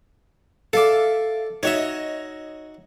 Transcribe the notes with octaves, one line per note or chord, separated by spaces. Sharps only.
A4 D5 E5 F5
D#4 F#4 C#5 D#5 E5